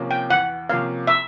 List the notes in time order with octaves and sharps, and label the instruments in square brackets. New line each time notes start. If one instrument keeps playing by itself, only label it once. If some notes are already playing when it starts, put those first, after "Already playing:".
Already playing: [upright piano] C3 F3 A#3 C#4
[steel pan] G5
[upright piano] E2 [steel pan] F#5
[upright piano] C3 F3 A#3 C#4 [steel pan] F5
[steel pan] E5